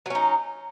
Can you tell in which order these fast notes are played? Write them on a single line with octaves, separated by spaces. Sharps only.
F#3 C#4 D#4